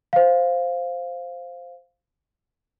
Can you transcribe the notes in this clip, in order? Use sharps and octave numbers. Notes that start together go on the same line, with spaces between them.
C5 F5